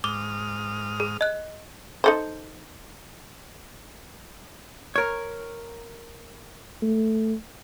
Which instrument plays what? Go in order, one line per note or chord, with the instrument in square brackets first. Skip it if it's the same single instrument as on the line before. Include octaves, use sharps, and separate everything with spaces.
[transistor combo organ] G#2 D#6 F6 [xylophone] D6
[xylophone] G#4
D#5 F#6
[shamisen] D#4 A4 C5
[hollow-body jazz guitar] A#4 C#5
[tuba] A3